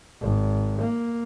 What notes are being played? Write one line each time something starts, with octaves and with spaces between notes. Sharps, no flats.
G#1
A#3